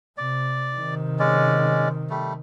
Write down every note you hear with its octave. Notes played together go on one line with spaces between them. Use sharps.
C3 D5
C3 D#3
G#3 C#4 D5
G3 A3